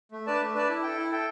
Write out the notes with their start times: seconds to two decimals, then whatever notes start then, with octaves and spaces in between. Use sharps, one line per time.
0.12 A3
0.27 D4 B4 D5 A5
0.41 A3
0.55 D4 B4 D5 A5
0.69 E4
0.83 A4 G5
0.98 E4
1.11 A4 G5